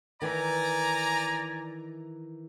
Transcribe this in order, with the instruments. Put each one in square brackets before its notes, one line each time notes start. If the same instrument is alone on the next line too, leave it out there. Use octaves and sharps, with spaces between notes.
[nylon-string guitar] D#3 E3 [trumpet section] D5 G#5 A#5